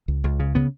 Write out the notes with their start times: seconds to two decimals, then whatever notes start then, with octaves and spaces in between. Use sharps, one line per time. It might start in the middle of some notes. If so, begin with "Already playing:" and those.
0.08 C#2
0.24 C#2
0.40 C#3
0.55 C#3 B3